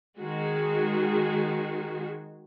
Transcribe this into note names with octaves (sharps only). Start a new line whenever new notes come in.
D#3 G#3 F#4 G#4